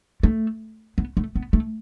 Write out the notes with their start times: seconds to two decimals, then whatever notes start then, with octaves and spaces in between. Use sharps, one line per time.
0.23 A3
0.98 B3
1.17 A3
1.35 B3
1.53 A3